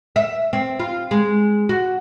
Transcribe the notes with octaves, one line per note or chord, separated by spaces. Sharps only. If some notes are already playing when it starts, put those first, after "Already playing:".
E5
C4
F4
G#3
F#4